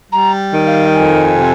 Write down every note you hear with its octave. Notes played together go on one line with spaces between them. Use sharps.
G3 A#5
D#3
F5
F2 G#5
C3